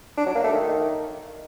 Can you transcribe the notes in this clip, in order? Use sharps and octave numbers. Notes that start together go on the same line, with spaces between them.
D4
F#3
A#3
A3
D#3